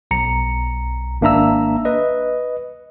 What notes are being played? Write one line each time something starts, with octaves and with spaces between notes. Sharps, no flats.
B1 A#5 C#7
G#1 A#3 D4 E5 A#5 E6
B4 D#5